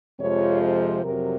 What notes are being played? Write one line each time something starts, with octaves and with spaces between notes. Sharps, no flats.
F2 C3 F3 G#3 C#5
C5
F2 C3 F#3 A#4